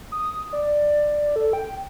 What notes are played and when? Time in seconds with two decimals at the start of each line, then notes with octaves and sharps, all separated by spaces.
0.12 D#6
0.53 D5
1.36 A4
1.53 G5